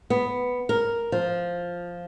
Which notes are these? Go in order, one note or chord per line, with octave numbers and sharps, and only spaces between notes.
B3
A#4
F3